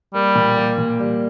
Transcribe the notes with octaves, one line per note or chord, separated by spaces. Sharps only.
G3 A#3
A#2
A#3
A#2
G3